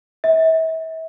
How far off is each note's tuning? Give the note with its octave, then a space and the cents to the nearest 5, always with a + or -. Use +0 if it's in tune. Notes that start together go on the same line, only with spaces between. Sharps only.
E5 -40